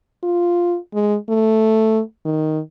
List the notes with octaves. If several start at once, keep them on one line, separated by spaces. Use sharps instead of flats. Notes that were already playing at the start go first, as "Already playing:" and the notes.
F4
G#3
A3
D#3